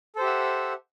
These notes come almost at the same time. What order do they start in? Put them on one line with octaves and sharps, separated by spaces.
A4 C5 G4 E5 F#5